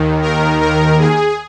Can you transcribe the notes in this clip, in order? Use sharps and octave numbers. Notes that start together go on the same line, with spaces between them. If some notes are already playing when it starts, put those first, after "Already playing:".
Already playing: D#2 D#3
A#4
A#4
G#4